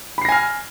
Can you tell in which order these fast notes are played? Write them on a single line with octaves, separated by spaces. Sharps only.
B5 C7 A#6 G#5 F6